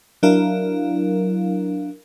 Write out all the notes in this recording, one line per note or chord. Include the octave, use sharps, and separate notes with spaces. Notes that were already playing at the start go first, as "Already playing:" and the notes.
F#3 D4 E4 A#4 F5